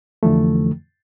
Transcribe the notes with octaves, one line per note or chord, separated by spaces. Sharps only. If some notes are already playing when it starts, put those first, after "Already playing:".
F2 D3 E3 F3 A3